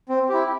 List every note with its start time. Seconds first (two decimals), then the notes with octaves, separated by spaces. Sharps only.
0.09 C4
0.29 E4 G4